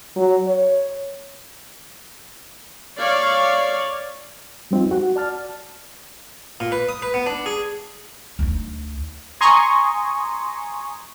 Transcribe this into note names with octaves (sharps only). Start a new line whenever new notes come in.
F#3
C#5
C#5 D5 F5
F#3 G3 C4 D#4 F4
F#4 F#5
D5 A5 F6 A6
A#2
B4
D#6
B4
B3
D4
G#4
D2 D#4
G#5 A#5 C6 C#6 D#6